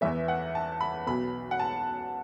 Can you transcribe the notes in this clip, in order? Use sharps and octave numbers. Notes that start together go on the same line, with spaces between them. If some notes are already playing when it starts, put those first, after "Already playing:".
E2 E3 B3 E5
F#5
A5
B5
B1 B2 B3 B5
F#5
A5